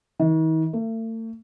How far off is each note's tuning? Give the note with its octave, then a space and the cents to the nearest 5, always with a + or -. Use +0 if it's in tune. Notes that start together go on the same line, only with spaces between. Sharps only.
D#3 +45
A3 +40